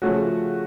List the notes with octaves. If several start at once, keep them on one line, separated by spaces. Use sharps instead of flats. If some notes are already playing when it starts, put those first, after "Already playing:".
C#3 F3 A3 C#4 F#4